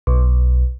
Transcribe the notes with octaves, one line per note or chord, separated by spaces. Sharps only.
B1